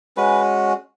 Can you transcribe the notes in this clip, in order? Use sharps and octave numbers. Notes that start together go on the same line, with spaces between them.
G#3 C#4 F#4 B4